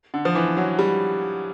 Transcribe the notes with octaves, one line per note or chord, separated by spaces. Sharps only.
D3
F3
E3
F#3
G3